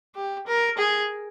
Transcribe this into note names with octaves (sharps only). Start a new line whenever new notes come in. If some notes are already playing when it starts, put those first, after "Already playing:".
G4
A#4
G#4